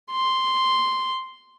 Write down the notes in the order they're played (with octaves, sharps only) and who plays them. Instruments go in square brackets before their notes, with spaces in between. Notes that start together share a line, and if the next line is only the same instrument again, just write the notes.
[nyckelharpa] C6